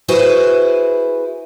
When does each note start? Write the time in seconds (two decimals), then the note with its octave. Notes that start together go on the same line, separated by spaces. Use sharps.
0.08 E4 F#4 G#4 B4 C5